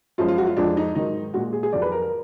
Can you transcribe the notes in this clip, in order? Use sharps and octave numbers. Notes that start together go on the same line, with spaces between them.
F#2 F3 G#3 F4
F4
F#4
F4
F2 F3 G#3 D4
D#4
G#2 D#3 F#3 D#4
A#2 G#3 F#4
G#4
G#4
F2 D#3 F#3 D5
B4
A#4
A#4